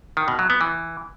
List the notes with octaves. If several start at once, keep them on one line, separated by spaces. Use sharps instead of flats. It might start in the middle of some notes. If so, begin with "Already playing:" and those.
D#3
B2
F#3
B3
E3